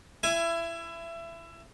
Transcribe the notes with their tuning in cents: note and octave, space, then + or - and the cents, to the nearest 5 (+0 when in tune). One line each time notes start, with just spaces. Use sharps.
E4 +25 G#5 +0